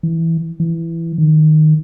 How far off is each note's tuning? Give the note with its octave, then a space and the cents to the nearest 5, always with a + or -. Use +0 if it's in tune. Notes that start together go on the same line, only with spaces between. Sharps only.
E3 -5
E3 +10
D#3 -10